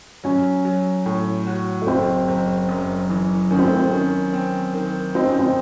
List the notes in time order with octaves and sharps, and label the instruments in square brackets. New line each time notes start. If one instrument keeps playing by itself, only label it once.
[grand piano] F#3 [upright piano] C#4
[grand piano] F#3
A2
F#4
[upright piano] A3
[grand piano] F#1 [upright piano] C4
[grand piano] F#1
F#2
E3
[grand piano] D#3 [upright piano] C#4
[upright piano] C4
A3
C4
[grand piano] D#3 [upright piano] C#4
[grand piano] C4
D#3
[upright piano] C4 [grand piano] D#4
[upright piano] C#4
C4